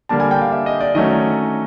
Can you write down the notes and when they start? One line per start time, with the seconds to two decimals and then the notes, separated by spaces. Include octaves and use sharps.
0.09 D3 G3 A#3 D4 A5
0.20 G#5
0.31 G5
0.41 F5
0.52 E5
0.66 D#5
0.81 D5
0.95 D#3 F#3 A3 C#4 D#5